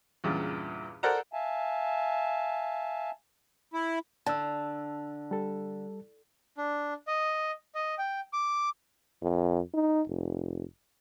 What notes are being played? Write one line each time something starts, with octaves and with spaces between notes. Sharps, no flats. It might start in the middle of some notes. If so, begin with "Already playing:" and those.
E2 G2 A#2 C#3
A4 A#4 C5 D5 F#5 A#5
E5 F5 G#5 A5
E4
D3 A5 E6
G3 A4
D4
D#5
D#5
G5
D6
F2
D#4
F1